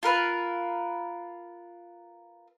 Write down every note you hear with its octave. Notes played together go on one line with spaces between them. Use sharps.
F4 A#4 B4 F5